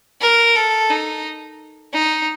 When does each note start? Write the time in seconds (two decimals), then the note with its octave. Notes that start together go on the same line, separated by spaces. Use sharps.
0.21 A#4
0.56 A4
0.90 D#4
1.94 D#4